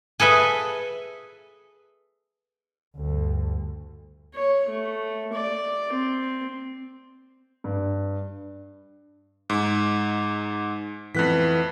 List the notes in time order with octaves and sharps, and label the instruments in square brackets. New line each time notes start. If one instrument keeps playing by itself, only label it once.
[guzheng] G#4 A4 B4 E5
[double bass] D2 G2
[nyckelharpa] C#5
A3
D5
C4
[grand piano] G2
[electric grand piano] G#2
[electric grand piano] F2 F#6 B6 [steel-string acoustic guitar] E3 A3 B3